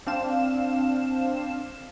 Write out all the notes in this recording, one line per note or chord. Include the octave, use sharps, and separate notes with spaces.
C4 D4 F5 E7